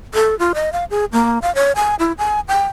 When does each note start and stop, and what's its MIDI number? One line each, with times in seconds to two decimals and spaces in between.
0.14 0.38 69
0.39 0.52 65
0.54 0.72 75
0.73 0.85 77
0.90 1.05 68
1.12 1.39 58
1.42 1.54 77
1.55 1.72 73
1.76 1.95 80
1.99 2.13 64
2.18 2.40 80
2.48 2.65 79